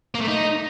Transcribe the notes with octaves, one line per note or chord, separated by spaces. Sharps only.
A#3
A3
D#4